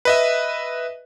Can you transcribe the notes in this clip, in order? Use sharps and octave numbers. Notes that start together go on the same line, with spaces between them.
B4 D#5 E5